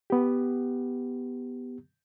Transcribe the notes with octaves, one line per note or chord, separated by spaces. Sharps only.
B3 G4